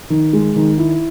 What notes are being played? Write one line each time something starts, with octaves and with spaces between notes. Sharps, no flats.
D#3
G#3
D#3
E4